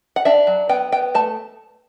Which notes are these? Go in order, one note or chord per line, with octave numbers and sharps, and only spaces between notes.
F#5
D4 E5
F#3
B3 G5
B3 G5
A3 A5